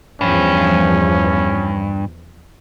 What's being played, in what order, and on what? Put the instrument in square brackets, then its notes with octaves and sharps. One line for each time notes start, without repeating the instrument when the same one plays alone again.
[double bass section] E2 F3 [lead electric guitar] G2 [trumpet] C#4